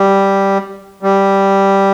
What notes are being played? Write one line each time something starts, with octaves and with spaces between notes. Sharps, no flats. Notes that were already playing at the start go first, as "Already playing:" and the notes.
Already playing: G3
G3